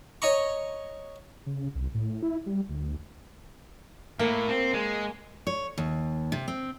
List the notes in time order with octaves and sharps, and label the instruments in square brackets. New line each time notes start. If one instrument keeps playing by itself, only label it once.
[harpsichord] C#5 D#5 A#5 C#6
[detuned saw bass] C#3
C2
A2
E4
G3
D2
[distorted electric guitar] A2 [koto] A#3
[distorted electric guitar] C4
G#3
[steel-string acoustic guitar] C#5
D#2
C3
C4